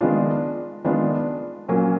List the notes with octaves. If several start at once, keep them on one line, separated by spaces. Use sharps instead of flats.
D#3 G#3 B3 D4 F4
D#3 G#3 B3 D4 F4
A#2 F#3 A#3 C#4